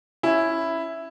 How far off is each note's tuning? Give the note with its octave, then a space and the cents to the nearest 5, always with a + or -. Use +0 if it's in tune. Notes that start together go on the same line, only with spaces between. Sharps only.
C#4 +0 E4 +0 G#5 +5